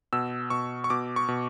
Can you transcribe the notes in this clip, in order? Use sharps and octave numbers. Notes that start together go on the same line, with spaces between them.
B2 E6
B2 C#6
C#6
B2 D6
C#6
B2